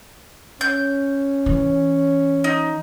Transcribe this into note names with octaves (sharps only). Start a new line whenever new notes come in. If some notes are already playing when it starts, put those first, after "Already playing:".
C#4 G6
E3
D#4